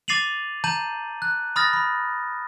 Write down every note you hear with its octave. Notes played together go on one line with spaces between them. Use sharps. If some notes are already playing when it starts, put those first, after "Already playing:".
D6 A6 C7 D#7 F7 F#7
A5 A#5 G6 D#7 F#7
F#6
B5 D#6 F6 A6 A#6
B5